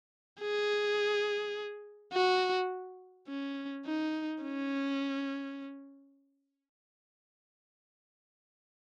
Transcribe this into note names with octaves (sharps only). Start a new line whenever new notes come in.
G#4
F#4
C#4
D#4
C#4